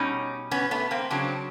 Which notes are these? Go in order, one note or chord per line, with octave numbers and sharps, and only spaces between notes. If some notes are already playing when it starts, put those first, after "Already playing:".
Already playing: B2 G3 C#4 D#4
B3 C#4
A3 B3
A#3 C4
C#3 F#3 C4 D4